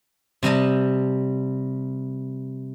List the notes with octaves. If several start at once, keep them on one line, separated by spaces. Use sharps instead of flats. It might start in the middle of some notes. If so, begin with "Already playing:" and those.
C3 G3 D#5 A5